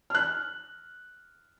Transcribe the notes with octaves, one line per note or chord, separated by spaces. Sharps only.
F6 F#6